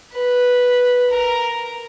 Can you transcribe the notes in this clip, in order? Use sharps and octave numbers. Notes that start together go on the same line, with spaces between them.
B4
A#4